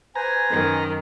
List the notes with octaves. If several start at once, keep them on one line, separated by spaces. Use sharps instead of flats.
B4 C5 G#5 A#5
F#2 D#3